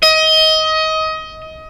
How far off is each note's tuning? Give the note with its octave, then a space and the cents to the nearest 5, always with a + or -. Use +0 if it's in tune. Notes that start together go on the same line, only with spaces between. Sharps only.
D#5 +25